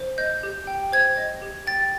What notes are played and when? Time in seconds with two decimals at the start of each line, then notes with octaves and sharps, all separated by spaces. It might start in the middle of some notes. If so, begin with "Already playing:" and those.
Already playing: C5
0.18 D#5 G6
0.43 G4
0.67 G5
0.92 C5 G#6
1.17 D#5
1.42 G4
1.67 G5 A6